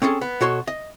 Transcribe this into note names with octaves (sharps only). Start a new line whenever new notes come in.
C4 C#4 G#4 A4
B3
B2 F#4 A4 C#5 C6
D#5